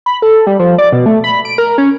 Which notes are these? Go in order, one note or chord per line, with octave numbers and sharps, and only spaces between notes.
B5
A4
G3
F3
D5
B2
A3
B5
D7
A#4
C#4